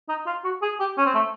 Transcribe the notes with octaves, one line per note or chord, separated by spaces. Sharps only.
D#4
F4
F#4
G#4
G4
C#4
C4
A3